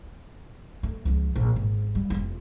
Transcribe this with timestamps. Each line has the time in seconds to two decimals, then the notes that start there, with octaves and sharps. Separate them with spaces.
0.83 A3
1.05 C#2 F3
1.35 A#1
1.56 G#1
1.95 G3
2.10 F1 F4